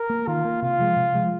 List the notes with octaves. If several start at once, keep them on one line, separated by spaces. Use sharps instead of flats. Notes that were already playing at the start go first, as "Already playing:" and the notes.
Already playing: A#4
A#3
D#3 F4
A#3
C3 F4
F3 G#3
C3
F3 G#3